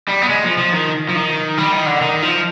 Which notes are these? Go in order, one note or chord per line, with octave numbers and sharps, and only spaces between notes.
G3
B3
G#3
F3
F3
D#3
F3
D#3
G3
D#3
D3
D#3
F3